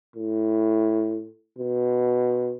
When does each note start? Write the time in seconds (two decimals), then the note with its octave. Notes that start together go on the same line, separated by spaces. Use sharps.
0.16 A2
1.58 B2